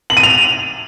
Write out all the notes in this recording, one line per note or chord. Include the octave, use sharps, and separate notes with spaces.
F#7
D#7
F7